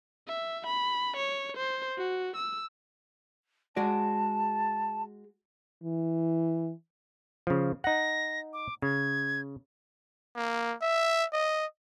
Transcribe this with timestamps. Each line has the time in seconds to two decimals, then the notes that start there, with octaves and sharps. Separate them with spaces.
0.27 E5
0.66 B5
1.16 C#5
1.57 C5
1.98 F#4
2.36 E6
3.76 G#3 F#4 D5 A5
5.84 E3
7.47 C#3 F3
7.84 D#4 F#5 A#6
8.53 D6
8.82 C#3 G#6
10.36 A#3
10.82 E5
11.33 D#5